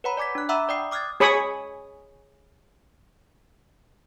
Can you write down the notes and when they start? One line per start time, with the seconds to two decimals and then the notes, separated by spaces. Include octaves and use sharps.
0.04 B4 C#5 F#5 A#5 B5
0.17 D5 G#5 D6 G#6 B6
0.35 D4 F#6
0.49 E5 F#5 A#5 B5 D6 E6
0.69 D5 G5 D#6 C7
0.91 D6 D#6 F6 F#6 G#6 A6
1.20 G#4 C#5 B5 C#6 D#6